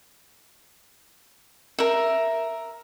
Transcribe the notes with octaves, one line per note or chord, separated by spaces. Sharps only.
A#4 E5